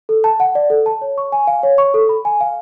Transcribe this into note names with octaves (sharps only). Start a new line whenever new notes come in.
A4
A5
F#5
D5
A4
A5
C#5
C#6
G#5
F5
C#5
C#6
A4
B5
G#5
F5